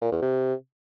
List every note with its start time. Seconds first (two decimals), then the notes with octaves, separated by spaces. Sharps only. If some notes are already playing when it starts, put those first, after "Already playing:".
0.02 A#2
0.12 E2
0.22 C3